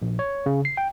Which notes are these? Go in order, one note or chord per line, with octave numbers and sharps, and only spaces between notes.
A#1
C#5
C#3
C7
G5